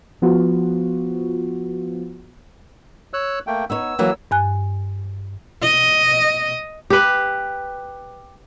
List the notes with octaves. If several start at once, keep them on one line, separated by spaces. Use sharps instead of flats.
F3 B3 F4 F#4
C#5 E6 F#6
A3 A#3 G5
B3 D#4 C#5 E6
E3 F#3 A#3
G2 G#5 F#6
D#5
G4 B4